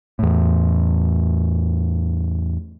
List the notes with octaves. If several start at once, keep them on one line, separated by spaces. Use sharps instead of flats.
E2 A2